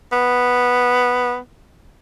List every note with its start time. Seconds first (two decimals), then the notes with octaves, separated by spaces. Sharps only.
0.12 B3